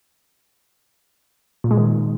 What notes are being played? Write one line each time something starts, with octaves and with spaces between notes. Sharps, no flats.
A#2
G#3
D#3